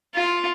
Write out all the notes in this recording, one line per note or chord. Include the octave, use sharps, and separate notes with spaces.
F4